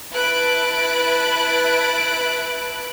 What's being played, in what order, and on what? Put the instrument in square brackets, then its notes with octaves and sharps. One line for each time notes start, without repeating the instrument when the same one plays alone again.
[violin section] E4 B4 A5 B5 F#6 D7